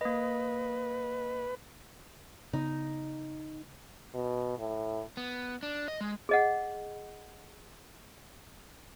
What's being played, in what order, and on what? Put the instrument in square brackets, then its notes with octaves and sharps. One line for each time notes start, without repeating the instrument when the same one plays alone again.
[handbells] A#3 D#5 [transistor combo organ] B4
[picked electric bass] C#3 B3 [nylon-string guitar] D#4
[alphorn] B2
A2
[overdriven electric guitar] B3
D4
D#5
G#3
[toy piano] G#4 D#5 F#5